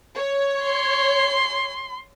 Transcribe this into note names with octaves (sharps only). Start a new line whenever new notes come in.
C#5
C6